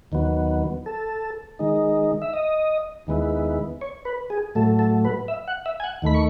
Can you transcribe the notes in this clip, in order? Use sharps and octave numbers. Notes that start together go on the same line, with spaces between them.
D#2 D#3 F#3 B3
A4
D#3 G#3 D#4
E5
D#5
D#2 D#3 G#3 B3 E4
C#5
B4
G#4
A2 F#3 A3 A4
A4
B4
E5
F#5
E5
G#5
F#5
D#2 D#3 A3 B5
C#6